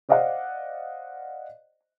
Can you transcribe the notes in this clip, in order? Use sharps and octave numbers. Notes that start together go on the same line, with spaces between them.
C5 D5 D#5 F5 F#5